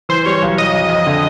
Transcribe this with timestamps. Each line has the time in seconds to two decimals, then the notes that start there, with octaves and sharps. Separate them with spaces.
0.09 E3 C5
0.26 G3 C#5
0.42 B1
0.58 F#3 D#5
0.75 F2
0.90 F2
1.06 D3